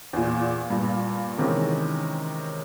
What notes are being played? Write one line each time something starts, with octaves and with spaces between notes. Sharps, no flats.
E2 A#2
G2 A#2
C3 D#3 E3 G#3 C#4